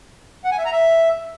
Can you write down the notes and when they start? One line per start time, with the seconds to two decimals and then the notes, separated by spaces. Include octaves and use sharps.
0.44 F#5
0.51 G#5
0.58 E5
0.65 A#5
0.72 E5